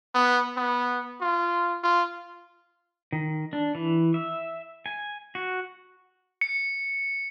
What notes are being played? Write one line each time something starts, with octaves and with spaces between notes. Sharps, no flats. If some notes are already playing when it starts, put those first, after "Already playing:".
B3
B3
F4
F4
D#3
D4
E3
E5
G#5
F#4
C#7